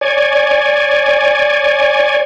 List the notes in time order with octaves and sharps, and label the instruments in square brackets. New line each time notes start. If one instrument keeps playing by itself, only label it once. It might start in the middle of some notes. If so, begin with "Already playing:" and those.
[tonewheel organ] C#5 D5 G#5